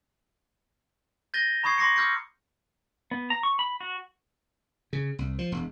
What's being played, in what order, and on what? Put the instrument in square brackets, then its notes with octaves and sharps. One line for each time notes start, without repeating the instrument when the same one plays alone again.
[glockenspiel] G6 A6 A#6 D#7 G7
A#5 B5 C#6 D#6 G#6 C7
C6 D6 A#6 C7 C#7
D6 E6 F6 G6 A#6 C#7
[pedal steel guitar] B3
A#5
C#6
B5
F#4
[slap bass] C#3
C2
F3
E1